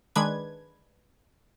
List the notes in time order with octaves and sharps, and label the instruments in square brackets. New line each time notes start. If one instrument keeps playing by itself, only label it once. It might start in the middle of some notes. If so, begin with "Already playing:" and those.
[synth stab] D#3 G#3 D4 B4 G#6